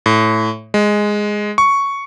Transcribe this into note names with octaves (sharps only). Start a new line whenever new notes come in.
A2
G#3
C#6